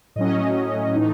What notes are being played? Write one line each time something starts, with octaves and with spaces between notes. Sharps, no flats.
A2 F#3 C#4 D#5
A2 E3 A3 D#4